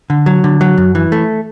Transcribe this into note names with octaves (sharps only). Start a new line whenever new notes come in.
D3
F#3
D3
F#3
F#2
E3
A3